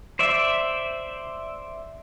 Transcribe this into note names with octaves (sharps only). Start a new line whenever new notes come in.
C5 D5 E5